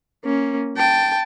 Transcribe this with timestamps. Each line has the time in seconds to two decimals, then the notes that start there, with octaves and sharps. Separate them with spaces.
0.24 A#3 C#4
0.77 G5 A5